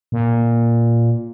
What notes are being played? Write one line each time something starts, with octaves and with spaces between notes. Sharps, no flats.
A#2